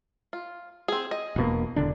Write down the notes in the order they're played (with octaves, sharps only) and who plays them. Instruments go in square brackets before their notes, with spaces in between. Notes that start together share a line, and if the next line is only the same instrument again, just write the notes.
[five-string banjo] F4
C4 G#4
D#5
[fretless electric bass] E1 B2 A#3
E1 D3 D4